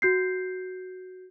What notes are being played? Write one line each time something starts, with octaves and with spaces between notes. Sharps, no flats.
F#4 G6 C7